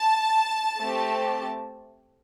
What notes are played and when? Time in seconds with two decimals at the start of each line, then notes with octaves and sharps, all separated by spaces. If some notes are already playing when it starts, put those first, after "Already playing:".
Already playing: A5
0.79 A3 C4 G4